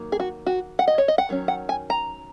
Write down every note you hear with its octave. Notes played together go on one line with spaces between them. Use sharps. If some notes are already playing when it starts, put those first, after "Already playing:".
Already playing: D#3 F#3 A#3
G#4
F#4
F#4
F#5
D#5
C#5
D#5
F#5
D#3 F#3 C#4
F#5
G#5
A#5